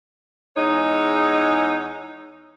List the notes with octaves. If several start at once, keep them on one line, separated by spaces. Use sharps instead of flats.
E2 G#3 D#4 C#5